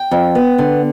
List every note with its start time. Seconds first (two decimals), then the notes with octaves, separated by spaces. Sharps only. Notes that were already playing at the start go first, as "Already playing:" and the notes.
Already playing: G5
0.11 F2
0.35 B3
0.58 D3